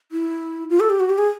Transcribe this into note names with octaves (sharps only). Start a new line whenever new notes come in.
E4
F4
A4
G4
F#4
G4
G#4